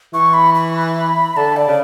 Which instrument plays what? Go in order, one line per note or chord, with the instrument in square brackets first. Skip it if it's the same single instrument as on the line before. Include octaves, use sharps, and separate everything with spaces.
[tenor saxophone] E3 [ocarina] C#6
[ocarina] B5
B5
[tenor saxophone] D3 [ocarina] A5
[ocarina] D5
[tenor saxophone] C#3